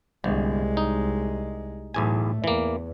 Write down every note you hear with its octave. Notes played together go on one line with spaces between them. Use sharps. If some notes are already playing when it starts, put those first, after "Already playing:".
G1 C2 G#3
D#4
B1 E2 A2 A3 G#5
E2 E3 A#3